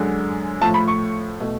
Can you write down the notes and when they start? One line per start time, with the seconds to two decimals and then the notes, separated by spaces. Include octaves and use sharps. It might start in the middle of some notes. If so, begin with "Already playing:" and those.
Already playing: F#2 D3 G#3
0.61 A2 F3 A3 A5
0.74 B5
0.88 C#6
1.40 B2 A3